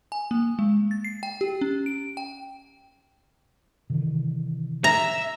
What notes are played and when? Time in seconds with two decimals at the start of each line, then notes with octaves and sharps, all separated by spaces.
0.12 G#5
0.31 A#3
0.59 G#3
0.91 A6
1.04 C7
1.23 G5
1.41 G4
1.61 C#4
1.86 D7
2.17 G5
3.90 C3 D#3 E3
4.84 E5 A#5